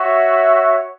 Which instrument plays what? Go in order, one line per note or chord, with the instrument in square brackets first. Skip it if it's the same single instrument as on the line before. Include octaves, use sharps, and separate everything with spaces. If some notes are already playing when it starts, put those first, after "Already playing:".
Already playing: [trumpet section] F#4 C#5 E5